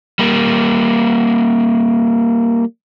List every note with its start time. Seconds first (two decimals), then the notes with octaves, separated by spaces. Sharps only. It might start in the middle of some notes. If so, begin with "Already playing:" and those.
0.19 G3 A#3